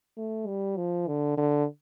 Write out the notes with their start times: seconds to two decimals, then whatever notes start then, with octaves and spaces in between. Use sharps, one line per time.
0.17 A3
0.47 G3
0.77 F3
1.07 D3
1.38 D3